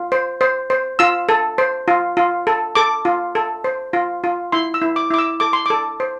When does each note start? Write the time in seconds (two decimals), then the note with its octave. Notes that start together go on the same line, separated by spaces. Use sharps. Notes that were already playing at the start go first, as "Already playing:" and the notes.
Already playing: F4
0.12 C5
0.41 C5
0.70 C5
0.99 F4 E6
1.29 A4
1.58 C5
1.88 F4
2.17 F4
2.47 A4
2.75 A4 D6
3.05 F4
3.35 A4
3.64 C5
3.93 F4
4.24 F4
4.52 E4 C6
4.74 E6
4.82 E4
4.96 D6
5.11 E4 D6
5.18 E6
5.40 A4 D6
5.53 C6
5.66 A4 D6
6.00 C5